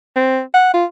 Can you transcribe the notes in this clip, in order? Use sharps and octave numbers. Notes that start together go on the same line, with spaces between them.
C4
F#5
F4